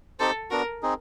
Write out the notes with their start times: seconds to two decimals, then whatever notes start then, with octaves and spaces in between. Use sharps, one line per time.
0.20 C4 D#4 G4 A4 C5
0.51 B3 D4 F#4 A#4
0.83 C4 D#4 G#4